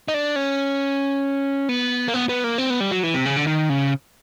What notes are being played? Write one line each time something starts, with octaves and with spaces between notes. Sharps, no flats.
D#4
D4
C#4
B3
A#3
B3
B3
A#3
C4
B3
G3
F#3
E3
C3
C#3
D3
D#3
C#3